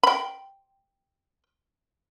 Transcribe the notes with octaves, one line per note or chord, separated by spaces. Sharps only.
G5 B5